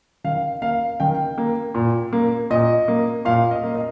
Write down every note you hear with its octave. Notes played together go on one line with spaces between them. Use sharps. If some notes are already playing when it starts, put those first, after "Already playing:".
D#3 F5
A#3 F5
D#3 G5
A#3
A#2
A#3
A#2 D#5
A#3
A#2 F5
D#5
A#3
D#5